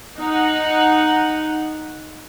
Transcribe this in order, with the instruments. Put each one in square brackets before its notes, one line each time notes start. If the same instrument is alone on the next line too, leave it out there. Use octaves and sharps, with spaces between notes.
[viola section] D#4 F#5